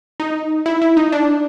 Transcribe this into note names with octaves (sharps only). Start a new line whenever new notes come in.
D#4
E4
E4
D#4
D4